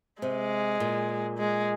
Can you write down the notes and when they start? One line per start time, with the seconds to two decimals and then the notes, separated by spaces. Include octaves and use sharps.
0.22 C3 G#3
0.80 A#2
1.38 G#3